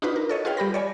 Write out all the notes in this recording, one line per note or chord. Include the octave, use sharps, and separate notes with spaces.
D4 D#4 F4 F#4 B4
A#4
A4 C#5 D#5
F4 G#4 A4 B4 F5 G5
G3 G4 B5 A#6
C#5 D5 G#5